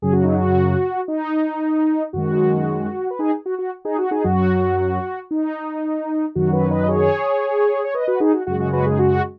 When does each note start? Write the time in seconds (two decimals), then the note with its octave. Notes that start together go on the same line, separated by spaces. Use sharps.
0.02 F#2 C#3 F#3 G#4
0.13 F#4
0.24 D#4
0.34 F#4
1.08 D#4
2.13 F#2 D#3 G#3 F#4
3.11 B4
3.19 D#4 G#4
3.46 F#4
3.59 F#4
3.85 D#4 G#4
3.98 F#4
4.11 D#4 G#4
4.24 F#2 F#3 F#4
5.31 D#4
6.35 F#2 D#3 F#3 F#4
6.53 F#4 B4
6.71 B4 D#5
6.83 D#5
6.88 G#4 C#5
7.84 C#5
7.94 B4 D#5
8.07 F#4 B4
8.20 D#4 G#4
8.34 F#4
8.47 F#2 C#3 G#3 F#4
8.60 F#4
8.73 F#4 B4
8.86 D#4 G#4
8.99 F#4